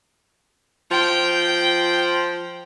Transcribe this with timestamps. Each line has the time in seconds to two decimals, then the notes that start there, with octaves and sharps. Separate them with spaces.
0.91 F3 G5